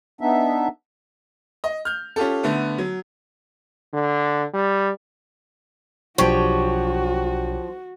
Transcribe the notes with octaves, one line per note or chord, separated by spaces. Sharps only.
B3 D4 D#4 E5
D#5
F6 G6
C#4 F4 G4 A4
D3 A3 B3
F#3
D3
G3
B1 F3 D4 F#4 G4 C#5